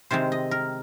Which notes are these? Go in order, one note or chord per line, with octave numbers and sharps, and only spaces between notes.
C3 D#3 G#3 C4 C5
D#5
A#4